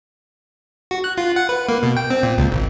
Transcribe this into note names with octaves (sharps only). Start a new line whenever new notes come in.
F#4
F#6
F4
F#5
B4
A#3
B2
G5
C4
A#2
C#2
G#1